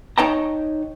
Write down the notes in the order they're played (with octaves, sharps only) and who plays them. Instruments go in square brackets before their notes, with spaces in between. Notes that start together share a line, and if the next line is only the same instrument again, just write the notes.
[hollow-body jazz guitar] D#4 C#5 D#5 G5 A5 A#5